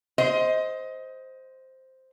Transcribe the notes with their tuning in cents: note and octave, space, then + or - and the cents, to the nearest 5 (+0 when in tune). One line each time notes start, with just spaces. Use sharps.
C5 +0 D#5 +20